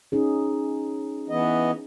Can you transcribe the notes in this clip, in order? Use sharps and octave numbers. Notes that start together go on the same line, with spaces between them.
C#4 D#4 G#4
E3 B3 D#5